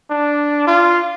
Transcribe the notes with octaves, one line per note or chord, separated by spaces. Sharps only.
D4
F4